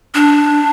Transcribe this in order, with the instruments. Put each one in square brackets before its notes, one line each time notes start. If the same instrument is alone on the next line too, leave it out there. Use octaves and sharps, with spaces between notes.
[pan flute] D4